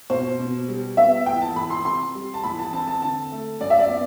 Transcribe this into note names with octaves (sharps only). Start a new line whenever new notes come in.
B2 C5
B2
G3
B3 E5
E2 G5
A5
E2 B5
C6
C3 C6
G3
A5
E2 B5
A5
C4 A5
A5
D3 A5
A3
F#2 D5
E5
D5
B3